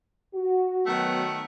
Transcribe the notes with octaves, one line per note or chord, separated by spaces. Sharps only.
F#4
D#3 F#3 A3 B3 F#5